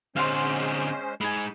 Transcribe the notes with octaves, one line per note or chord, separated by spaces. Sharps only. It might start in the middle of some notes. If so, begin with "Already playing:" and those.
D3 G#3 C4 C#4 C5 F5 F#5 C6
G#3 D#4 G#5 B5